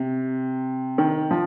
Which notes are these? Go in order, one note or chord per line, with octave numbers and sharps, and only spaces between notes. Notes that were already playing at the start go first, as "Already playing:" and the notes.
Already playing: C3
D#3
F3